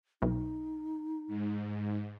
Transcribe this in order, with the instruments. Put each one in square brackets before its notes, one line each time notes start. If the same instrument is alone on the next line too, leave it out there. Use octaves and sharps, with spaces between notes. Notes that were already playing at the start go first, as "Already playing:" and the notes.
[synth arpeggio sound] B1 [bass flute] D#4
[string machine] G#2